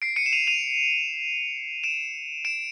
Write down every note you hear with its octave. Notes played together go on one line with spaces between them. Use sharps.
C7 D7
C#7 D#7
E7
D#7 F7
D#7 F7
D7 E7
D7 E7